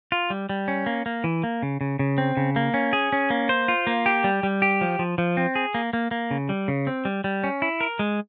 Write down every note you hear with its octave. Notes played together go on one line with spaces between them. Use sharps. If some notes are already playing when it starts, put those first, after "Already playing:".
F4
G3
G3
C#4
A#3
A#3
E3
A#3
C#3
C#3
C#3
C4
C#3
A#3
C#4
G#4
C#4
A#3
C5
F4
A#3
G4
G3
G3
G4
F3
F3
F3
C4
G#4
A#3
A#3
A#3
C#3
G3
C#3
C4
G3
G3
C#4
E4
A#4
G#3